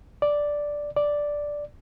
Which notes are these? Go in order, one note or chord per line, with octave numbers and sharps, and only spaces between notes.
D5
D5